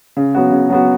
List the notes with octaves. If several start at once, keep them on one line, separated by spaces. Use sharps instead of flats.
C#3
F#3 B3 F#4
C#3
F#3 B3 F#4